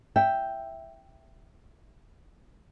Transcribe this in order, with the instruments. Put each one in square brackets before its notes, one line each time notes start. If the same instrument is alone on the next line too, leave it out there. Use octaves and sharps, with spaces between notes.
[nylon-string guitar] E5 G5